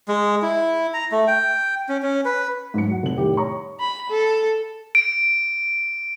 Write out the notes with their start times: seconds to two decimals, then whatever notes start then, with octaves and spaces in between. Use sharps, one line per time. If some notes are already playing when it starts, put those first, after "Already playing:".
0.08 G#3
0.42 E4
0.94 A#5
1.12 A3
1.27 G5
1.89 C#4
2.02 C#4
2.25 B4
2.74 G#2 F#3 F#4 C#7
2.88 F#3 F#5
3.03 F1 F#7
3.18 A2 D#3 G3 G4
3.37 C#5 A#5 C#6
3.80 B5
4.10 A4
4.95 D7